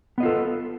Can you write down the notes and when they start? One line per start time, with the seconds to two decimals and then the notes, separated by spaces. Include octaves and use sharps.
0.18 B3
0.20 D#5
0.23 F4
0.25 A4
0.28 B4